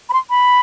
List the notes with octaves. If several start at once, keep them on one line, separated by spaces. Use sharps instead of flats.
B5
C6
B5